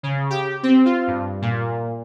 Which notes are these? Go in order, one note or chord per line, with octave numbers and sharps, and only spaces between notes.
C#3
G4
C4
F4
G2
A#2